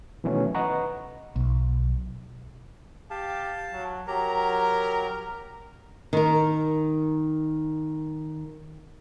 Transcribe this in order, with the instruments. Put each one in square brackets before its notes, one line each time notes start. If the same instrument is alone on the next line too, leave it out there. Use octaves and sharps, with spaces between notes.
[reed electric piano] B2 D#3 E3 F#3 A3 C#4
B4 D#5 F#5 A#5 C#6
[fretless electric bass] B1
[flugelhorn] G4 [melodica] F5 A5
[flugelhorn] F#3
[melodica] F#3 G4 A#5 [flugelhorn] A#4
[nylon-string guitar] D#3 A#4